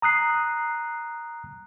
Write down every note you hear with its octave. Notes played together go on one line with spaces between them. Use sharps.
A#5 D#6 F#6 C7